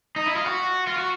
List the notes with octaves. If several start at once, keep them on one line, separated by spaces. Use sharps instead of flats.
D#4
E4
F4
F#4
F4
F#4